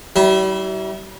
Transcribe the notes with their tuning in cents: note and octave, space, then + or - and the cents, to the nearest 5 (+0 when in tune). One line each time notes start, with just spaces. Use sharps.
G3 -45 E4 -20